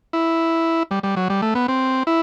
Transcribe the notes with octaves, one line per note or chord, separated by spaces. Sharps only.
E4
G3
G3
F#3
G3
A3
B3
C4
E4